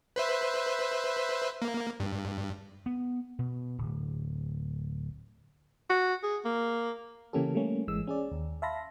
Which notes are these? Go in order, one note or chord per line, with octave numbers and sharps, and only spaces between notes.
B4 C5 E5
A#3
G2
B3
B2
D1
F#4
G#4
A#3
C#3 E3 A#3 C#4 G4 A4
G3 A3 A#3 C#4
G#1 E3 G#3 E6
C#4 G#4 D5
D#2
E5 F5 A5 B5 C6 A#6